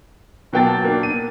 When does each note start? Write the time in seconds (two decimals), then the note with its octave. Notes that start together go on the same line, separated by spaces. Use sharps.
0.53 B2 F#3 A#3 G5 A5 A6
0.85 A#3 D4
1.03 D#7